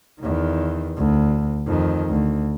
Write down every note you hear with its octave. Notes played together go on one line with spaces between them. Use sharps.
E2 D#3
D2
F2 D#3
D2